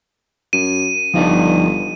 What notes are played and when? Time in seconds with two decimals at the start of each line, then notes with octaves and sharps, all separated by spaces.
0.53 F#2 D#7
1.14 G1 F3 D#4 D5